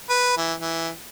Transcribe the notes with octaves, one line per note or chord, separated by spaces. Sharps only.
B4
E3
E3